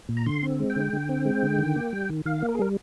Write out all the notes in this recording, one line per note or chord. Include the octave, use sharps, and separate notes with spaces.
A#2
A#5
D3 C6
C4
G#3
G5
D3
D3
C4
G#3
D3
D#3
A#3
G3
D#3
D#3 F5
A#3
A#4
G#4
G3 A#4